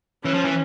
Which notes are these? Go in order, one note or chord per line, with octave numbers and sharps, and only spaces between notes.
E3 C#4
F3
E3